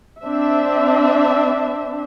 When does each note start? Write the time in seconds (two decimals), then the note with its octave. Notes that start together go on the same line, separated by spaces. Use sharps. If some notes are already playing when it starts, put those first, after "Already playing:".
0.23 C4 D4 E5